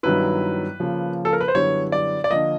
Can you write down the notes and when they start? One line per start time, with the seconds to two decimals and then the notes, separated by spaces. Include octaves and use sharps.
0.03 G2 D#3 F#3 B3 E4 B4
0.80 C#3 F3 A#3
1.25 A4
1.33 A#4
1.41 B4
1.48 C5
1.55 F#2 D3 G3 B3 E4 C#5
1.92 D5
2.24 D5
2.30 D3 F3 A#3 D#5